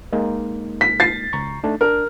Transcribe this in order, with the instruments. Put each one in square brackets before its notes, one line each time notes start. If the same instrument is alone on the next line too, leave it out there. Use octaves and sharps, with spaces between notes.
[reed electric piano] G#3 A#3 D#4
[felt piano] B6
A6 C7
[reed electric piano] C#2 A#5 C#6
A3 D4 D#4
[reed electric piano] D4 [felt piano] A#4